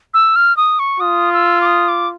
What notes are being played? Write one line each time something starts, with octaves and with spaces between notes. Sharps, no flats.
E6
F6
D#6
C#6
F4 D#6
E6
D6
D#6
D6